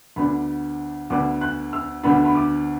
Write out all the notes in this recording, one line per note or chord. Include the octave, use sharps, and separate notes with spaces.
D2 D3 B3 D4 B5
D2 D3 B3 D4 D6
F#6
E6
D2 D3 B3 D4 B5
B5
D6